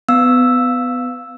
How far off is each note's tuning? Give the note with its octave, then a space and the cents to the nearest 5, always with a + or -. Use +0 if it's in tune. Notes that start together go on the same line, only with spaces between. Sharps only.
B3 +25 F5 +0 E6 +0